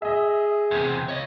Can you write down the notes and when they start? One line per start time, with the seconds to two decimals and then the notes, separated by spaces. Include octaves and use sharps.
0.02 G#4 D#5 E5
0.71 E2 C3
1.09 C#5 D#5